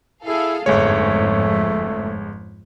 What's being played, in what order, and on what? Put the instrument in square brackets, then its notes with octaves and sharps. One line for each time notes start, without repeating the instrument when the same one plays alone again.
[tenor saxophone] E4 [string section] G#4 A4 F5
[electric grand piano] G1 G#3 C#5 [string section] F2 G#2 [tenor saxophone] A3